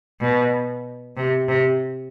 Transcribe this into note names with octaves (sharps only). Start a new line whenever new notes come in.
B2
C3
C3